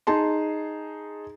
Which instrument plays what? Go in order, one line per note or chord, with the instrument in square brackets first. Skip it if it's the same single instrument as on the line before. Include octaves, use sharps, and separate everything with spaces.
[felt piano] D#4 G#4 A5 C6